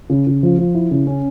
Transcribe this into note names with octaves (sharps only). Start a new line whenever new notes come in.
C#3
C#3
F3
F3
E4
C#3
C#4